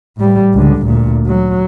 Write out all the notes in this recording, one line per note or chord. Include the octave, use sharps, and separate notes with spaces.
A2 G3
C#2 D3
D2 A#2
F#3